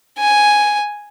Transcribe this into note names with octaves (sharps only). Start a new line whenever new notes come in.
G#5